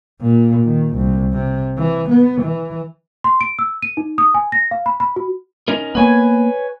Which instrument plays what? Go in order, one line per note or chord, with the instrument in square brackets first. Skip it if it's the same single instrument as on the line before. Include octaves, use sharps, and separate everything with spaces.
[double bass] A#2
D#3
C2
C3
E3
B3
E3
[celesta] C6
D7
E6
D#7
D#4
D#6
G#5
A#6
F5
B5
B5
F#4
[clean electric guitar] C#4 D#4 A#4
[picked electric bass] A#3 B3 [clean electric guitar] B4 C#5 G#5